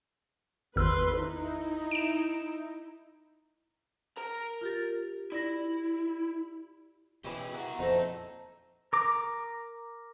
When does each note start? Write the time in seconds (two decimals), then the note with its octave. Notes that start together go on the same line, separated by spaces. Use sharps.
0.76 G#1 E2 B4 C6 E6
1.15 D#4 E4
1.91 D7 E7
4.17 A#4 A#5
4.61 F4 G4 A6
5.32 E4 D5 A#6
7.24 B2 E3 C#4 E4 G4 G#4
7.53 E4 F#4 A#4
7.79 F2 A#2 D#4 A4 C5
8.93 A#4 D6